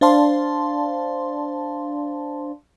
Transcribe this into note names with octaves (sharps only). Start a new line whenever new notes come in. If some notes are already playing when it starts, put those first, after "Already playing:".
D4 C5 D5 F5 A5 C6